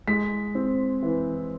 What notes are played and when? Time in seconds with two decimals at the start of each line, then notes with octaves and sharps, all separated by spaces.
0.08 G#3 B6
0.55 C4
1.03 E3